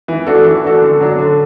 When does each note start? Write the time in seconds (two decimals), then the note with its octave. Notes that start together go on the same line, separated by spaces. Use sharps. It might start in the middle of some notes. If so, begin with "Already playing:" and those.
0.08 E3
0.27 A3 D4 F#4 A4
0.45 E3
0.63 A3 D4 F#4 A4
0.82 D3
1.00 F#3 D4
1.18 D3